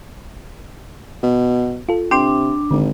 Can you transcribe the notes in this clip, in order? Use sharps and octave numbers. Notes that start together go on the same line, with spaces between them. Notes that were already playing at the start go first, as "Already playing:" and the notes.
B2
F4 A4
C3 D4 G5 C6 D6
G#1 D3